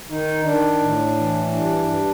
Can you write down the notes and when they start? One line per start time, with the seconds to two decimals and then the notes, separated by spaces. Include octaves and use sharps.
0.10 D#3 D#4
0.44 D#3 D4
0.81 A2
1.17 E3
1.52 G2 D4
1.88 G2